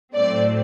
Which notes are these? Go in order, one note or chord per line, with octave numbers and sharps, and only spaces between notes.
A2 F#3 A3 C4 D5